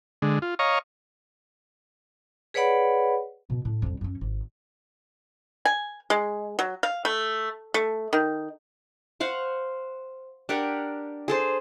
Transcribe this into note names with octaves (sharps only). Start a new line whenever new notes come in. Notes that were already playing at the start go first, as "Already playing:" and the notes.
D3 G#3
F4
C#5 D#5 F5 A#5 C#6
G#4 B4 C#5 D5 F#5 B5
B2
A2
F2 G3
F#2 C#4
G#1
G#5
G#3
F#3
F5
A3
A3
D#3
C5 F5 F#5 C#6
D4 G4 A#4 F#5
G#4 A4 C5